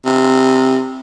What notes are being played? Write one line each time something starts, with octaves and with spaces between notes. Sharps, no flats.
C3